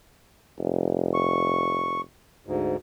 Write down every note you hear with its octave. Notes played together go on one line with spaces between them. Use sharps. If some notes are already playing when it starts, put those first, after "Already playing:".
F1
C#6
D2 G#2